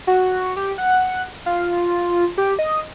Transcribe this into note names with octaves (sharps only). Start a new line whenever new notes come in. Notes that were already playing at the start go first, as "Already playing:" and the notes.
F#4
G4
F#5
F4
G4
D#5